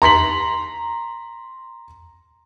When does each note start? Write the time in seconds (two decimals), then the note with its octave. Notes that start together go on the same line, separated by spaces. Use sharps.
0.02 A#5 C6 B6 F#7